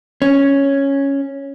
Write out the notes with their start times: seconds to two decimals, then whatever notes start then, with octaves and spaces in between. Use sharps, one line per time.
0.22 C#4